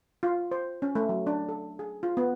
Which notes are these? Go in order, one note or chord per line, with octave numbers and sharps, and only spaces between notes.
F4
C5
C#4
A3
F#3
D4
A4
G#4
F4
B3